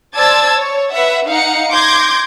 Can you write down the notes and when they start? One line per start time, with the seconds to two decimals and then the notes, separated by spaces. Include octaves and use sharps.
0.16 C5 D5 A5 E6 G#6 A6
0.58 C#5
0.93 B4 E5 F#5
1.28 D#4 F5 F#5 C#7
1.72 C6 D6 G6 G#6 A#6